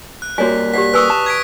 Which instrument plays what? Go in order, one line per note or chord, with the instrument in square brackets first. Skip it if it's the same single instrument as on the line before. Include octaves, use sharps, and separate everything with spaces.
[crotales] F#6
[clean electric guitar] G3 A#3 [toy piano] F#4 C#5 G#5 [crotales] B6
[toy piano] G4 D5 F#5 [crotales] B6
[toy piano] B4 G#5 E6 [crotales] C#6 D#6 F#6
[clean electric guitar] A5
[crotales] G#6 B6 D7